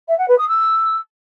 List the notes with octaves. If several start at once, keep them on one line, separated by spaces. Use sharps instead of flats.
E5
F#5
B4
D#6
E6